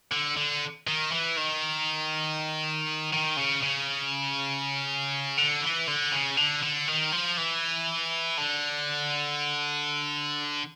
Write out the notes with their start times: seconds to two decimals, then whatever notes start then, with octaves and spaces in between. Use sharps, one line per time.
0.12 D3
0.37 D3
0.87 D#3
1.12 E3
1.37 D#3
3.13 D#3
3.37 C#3
3.63 C#3
5.38 D3
5.62 E3
5.88 D3
6.12 C#3
6.37 D3
6.63 D3
6.88 D#3
7.12 F3
7.37 E3
8.38 D3